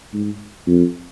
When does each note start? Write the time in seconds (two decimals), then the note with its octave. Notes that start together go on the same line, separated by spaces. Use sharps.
0.14 G#2
0.67 F2